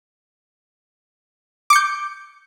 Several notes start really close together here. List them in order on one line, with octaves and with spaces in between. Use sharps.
D6 C#7 G6